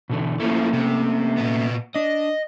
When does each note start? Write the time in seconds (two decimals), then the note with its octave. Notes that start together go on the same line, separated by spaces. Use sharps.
0.10 B2 D3 E3
0.40 E3 F3 A3 A#3 C#4
0.73 C3
1.37 A#2 B3
1.96 D4 D#5